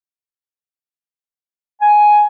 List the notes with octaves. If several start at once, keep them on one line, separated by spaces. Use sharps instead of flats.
G#5